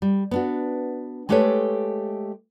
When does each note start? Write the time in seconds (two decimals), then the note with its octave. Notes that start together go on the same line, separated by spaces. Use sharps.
0.02 G3
0.31 B3 D4 F#4
1.29 G#3 A3 G4 A4 B4 C#5